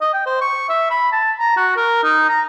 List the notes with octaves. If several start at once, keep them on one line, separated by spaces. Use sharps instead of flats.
D#5
G5
C5
C#6
E5
B5
A5
A#5
F#4
A#4
D#4
A#5